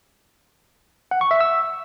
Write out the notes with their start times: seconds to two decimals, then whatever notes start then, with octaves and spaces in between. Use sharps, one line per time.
1.11 F#5
1.21 C#6
1.31 E5
1.41 E6